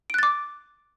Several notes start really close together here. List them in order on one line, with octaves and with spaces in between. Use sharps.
D7 F#6 A6 D6